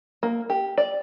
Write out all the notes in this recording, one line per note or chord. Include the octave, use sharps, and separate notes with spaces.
A#3
G4
D5